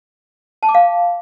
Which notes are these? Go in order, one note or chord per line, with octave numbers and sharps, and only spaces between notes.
A5
D6
F5